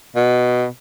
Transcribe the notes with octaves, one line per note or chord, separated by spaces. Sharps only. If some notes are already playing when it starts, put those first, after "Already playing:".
B2